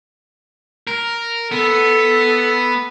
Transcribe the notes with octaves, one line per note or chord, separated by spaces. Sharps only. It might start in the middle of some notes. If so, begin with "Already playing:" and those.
A#4
B3 A4